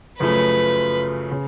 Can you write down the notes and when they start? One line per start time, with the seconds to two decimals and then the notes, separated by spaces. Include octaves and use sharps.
0.20 F#2 C#3 F3 A3 B4
1.31 C#3